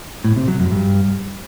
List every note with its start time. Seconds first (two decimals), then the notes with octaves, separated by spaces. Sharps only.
0.24 A2
0.36 C3
0.48 F#3
0.60 F#2
0.71 G2